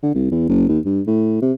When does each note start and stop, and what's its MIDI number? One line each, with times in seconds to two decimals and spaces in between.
0.03 0.12 50
0.15 0.29 36
0.32 0.44 40
0.49 0.65 30
0.69 0.79 39
0.85 1.01 43
1.07 1.39 45
1.42 1.53 48